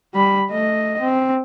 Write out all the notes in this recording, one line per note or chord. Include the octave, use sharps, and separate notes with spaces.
G3 B5
A3 D#5
C4